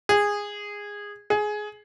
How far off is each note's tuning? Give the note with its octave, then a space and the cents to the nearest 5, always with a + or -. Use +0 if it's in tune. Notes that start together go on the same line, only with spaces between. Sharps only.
G#4 -15
G#4 +15